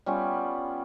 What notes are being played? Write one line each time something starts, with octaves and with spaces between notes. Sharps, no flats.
G3 B3 C#4 F4